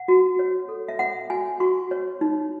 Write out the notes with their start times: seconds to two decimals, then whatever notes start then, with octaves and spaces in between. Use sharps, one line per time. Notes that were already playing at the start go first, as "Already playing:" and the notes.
Already playing: F#5
0.08 F#4
0.39 C#5
0.69 A4
0.88 E5
0.99 C#5 F#5
1.30 F#4 G#5
1.60 F#4 C#6
1.91 C#5
2.21 D#4